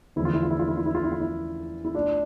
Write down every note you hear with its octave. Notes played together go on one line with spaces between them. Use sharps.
E2 D3 F3 A3 E4
F4
E4
F4
E4
F4
E4
F4
E4
F4
E4
F4
E4
E4
B2 A3 D4 F4